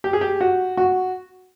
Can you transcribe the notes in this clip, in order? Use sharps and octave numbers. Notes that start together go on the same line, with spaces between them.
G4
G#4
G4
F#4
F#4